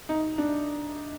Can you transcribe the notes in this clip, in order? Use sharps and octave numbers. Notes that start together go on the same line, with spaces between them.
D#4
D4